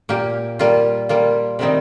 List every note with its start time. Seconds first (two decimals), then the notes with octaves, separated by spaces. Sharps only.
0.09 A#2 A#3 G4
0.59 G3 A#3 F4
1.09 G3 A#3 F4
1.59 C3 D#3 G3 C4 D#4